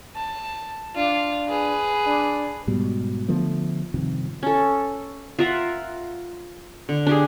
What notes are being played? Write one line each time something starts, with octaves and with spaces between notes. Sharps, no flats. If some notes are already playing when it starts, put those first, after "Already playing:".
A5
D4 F4
G#4 B4
D4
G#2 B2 G3
D3 F3 A3 B3
G2 C3 D#3 F3
C#4 A4
F4 A#4 E5 F#5
D3
D4 G4 G#4